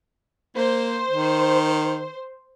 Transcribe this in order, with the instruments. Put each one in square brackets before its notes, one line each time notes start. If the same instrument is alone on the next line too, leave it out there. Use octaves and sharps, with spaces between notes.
[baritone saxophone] A#3 [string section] C5
[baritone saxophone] D#3